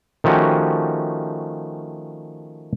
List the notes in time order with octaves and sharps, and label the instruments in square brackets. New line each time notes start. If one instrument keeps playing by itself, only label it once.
[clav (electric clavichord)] D#3 F3 A3 C#4 F#4 G4